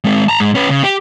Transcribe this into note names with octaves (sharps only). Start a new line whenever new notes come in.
G#3 C4
A5 A#5
G#2 G#3
C#4 B4
C#3
G4